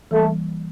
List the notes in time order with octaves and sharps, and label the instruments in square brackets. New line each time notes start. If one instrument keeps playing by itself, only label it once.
[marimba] E3 G3 A#3 [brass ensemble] A3